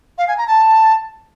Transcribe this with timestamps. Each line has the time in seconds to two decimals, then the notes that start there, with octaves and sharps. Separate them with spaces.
0.18 F5
0.28 G#5
0.38 A#5
0.48 A5